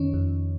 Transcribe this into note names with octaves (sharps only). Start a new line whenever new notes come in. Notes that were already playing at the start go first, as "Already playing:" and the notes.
Already playing: F2 D#3 C#4
F2